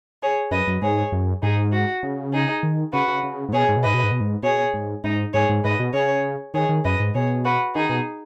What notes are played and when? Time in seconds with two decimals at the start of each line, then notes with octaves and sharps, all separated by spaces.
0.22 G#4 C#5
0.51 F#2 B4 D#5
0.67 F#2
0.82 G#2 G#4 C#5
1.12 F#2
1.42 G#2 D#4 G#4
1.72 F#4
2.03 C#3
2.32 D#4 G#4
2.63 D#3
2.93 C#3 F#4 B4
3.08 C#3
3.23 C#3
3.49 G#2
3.53 B2 G#4 C#5
3.69 G#2
3.77 B2
3.83 G#2 B4 D#5
3.94 B2
4.04 G#2
4.12 B2
4.21 G#2
4.43 B2 G#4 C#5
4.74 G#2
5.04 G#2 D#4
5.33 G#2 G#4 C#5
5.49 G#2
5.64 G#2 B4 D#5
5.79 B2
5.94 C#3 G#4 C#5
6.54 D#3 G#4 C#5
6.69 D#3
6.84 F#2 B4 D#5
7.00 G#2
7.14 B2 G#4 C#5
7.45 F#4 B4
7.75 D#3 D#4 G#4
7.89 B2